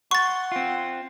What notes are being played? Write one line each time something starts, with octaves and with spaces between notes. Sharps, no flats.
F#5 C6 C#6 A6
C4 F4